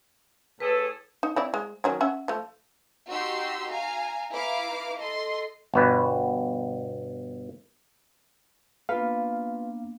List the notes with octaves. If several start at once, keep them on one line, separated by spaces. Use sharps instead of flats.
A2 G#4 A4 B4
D#4
C4 E4 D5
G#3
D#3 F#3 C#4
C#4 E5 F#5
F3 A3
D#4 F#4 G4 C6 E6
F5 G#5 A#5
E4 B4 F5 A#5 D6
A4 D#5 C6
G1 B2 B4
A#3 B3 D4 F4 B4 F5